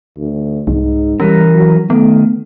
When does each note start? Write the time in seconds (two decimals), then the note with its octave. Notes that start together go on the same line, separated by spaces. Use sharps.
0.18 D2
0.67 C2 G#2
1.20 E3 G3 C#4 A#4
1.54 F#3
1.90 D#3 A3 B3